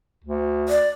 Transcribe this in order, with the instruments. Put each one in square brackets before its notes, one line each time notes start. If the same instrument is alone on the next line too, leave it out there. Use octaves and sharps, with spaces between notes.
[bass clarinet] D2
[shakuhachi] D5